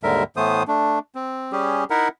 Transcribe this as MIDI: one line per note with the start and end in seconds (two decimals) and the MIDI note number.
0.03 0.23 39
0.03 0.23 44
0.03 0.23 50
0.03 0.23 55
0.03 0.23 70
0.03 0.23 76
0.37 0.63 45
0.37 0.63 52
0.37 0.63 57
0.37 0.63 59
0.37 0.63 72
0.37 0.63 87
0.68 0.99 57
0.68 0.99 62
1.15 1.52 60
1.52 1.84 55
1.52 1.84 61
1.52 1.84 67
1.52 1.84 68
1.90 2.08 63
1.90 2.08 64
1.90 2.08 70
1.90 2.08 76
1.90 2.08 78